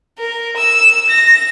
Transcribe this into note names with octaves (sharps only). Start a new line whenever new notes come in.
A#4
E6
A#6